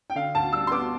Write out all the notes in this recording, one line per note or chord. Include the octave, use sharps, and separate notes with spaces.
G5
D3 F5
D2 A5
G3 E6
C6
B3 D6